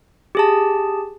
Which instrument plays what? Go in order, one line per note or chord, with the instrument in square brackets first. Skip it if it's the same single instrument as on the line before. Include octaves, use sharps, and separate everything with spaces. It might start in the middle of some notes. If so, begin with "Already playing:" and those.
[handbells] G4 G#4 A5